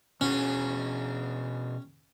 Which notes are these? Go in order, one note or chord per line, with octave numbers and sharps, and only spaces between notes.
B2 C#4 F#4 G#4